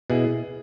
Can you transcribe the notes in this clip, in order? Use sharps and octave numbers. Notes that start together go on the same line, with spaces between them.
B2 E4 G#4